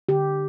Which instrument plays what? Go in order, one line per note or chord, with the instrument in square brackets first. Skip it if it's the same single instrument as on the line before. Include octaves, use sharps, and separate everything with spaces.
[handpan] D3 G4